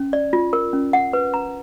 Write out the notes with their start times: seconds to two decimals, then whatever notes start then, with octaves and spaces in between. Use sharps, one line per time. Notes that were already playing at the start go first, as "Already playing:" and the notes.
Already playing: C#4
0.13 D5
0.33 F4
0.53 A#4
0.73 C#4
0.93 F#5
1.13 B4
1.34 A#5